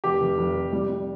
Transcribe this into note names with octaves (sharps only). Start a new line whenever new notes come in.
F1 G4
F1
F1
F1
G3
G3